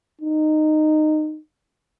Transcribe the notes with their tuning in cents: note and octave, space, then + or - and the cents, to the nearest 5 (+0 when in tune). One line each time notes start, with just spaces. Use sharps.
D#4 -15